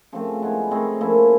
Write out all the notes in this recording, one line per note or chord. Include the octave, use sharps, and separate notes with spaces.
C#3 F3 A3 C4
G#3 B3 E4
A3 C4 D#4 G#4
F3 A#3 C#4 E4